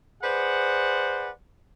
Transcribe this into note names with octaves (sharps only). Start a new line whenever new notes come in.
G#4 B4 C5 D5 F#5